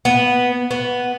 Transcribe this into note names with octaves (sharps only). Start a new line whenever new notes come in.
B3
B3